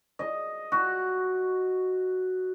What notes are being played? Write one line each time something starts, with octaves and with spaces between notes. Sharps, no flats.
D#5
F#4